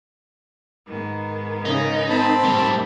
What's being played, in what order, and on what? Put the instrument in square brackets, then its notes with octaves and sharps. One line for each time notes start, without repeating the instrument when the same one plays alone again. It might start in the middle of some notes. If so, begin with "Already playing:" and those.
[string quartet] G#2 D#3 B3
[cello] C#3 [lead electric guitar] D#4
[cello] C4 [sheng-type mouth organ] A5 B5
[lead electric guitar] A2 G3